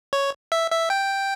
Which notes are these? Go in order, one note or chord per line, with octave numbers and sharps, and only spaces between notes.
C#5
E5
E5
G5